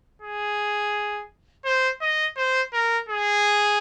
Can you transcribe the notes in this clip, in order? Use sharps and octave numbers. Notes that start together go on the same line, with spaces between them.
G#4
C5
D#5
C5
A#4
G#4